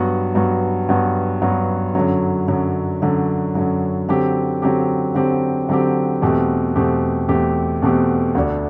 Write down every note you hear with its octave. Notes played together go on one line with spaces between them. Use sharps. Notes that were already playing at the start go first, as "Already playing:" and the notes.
Already playing: G2 F#3 B3 F#4
G2 F#3 B3 F#4
G2 F#3 B3 F#4
G2 F#3 B3 F#4
F#2 D3 F#3
F#2 D3 F#3
F#2 D3 F#3
F#2 D3 F#3
D3 F#3 C4 G4
D3 F#3 C4 G4
D3 F#3 C4 G4
D3 F#3 C4 G4
E2 B2 A3 C4 G4
E2 B2 A3 C4 G4
E2 B2 A3 C4 G4
E2 B2 A3 C4 G4
D2 D3 A3 D4